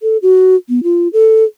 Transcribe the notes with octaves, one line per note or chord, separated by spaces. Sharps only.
A4
F#4
B3
F4
A4